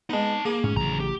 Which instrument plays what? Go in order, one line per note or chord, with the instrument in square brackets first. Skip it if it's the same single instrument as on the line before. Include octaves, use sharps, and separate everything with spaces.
[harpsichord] G#3 B3 [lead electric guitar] D#4 A5
[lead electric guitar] A#3 [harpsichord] G#4
[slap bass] G#2 [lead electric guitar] C#4
[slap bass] A1 C#3 F#3 [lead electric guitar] D2 A#5
[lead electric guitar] G4